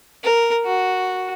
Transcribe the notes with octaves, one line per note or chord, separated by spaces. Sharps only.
A#4
F#4